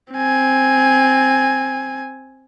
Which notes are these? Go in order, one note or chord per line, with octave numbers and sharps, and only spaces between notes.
C4 G#5